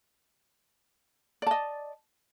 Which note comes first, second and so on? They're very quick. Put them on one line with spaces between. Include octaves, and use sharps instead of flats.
D5 A5 D#5